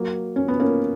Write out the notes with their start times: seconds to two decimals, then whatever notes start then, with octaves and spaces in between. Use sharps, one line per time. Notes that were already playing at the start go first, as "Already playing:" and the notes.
Already playing: F#3 A#3
0.36 C#4
0.48 B3
0.59 A#3 C#4